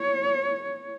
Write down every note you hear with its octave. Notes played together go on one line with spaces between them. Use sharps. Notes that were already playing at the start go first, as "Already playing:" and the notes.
Already playing: C#5